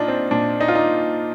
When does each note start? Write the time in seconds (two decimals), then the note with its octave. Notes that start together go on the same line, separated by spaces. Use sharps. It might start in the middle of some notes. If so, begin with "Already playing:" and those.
Already playing: A#2 D4 D#4 F4
0.08 C4
0.31 A#2 D4
0.61 D#4
0.68 F4
0.75 D#4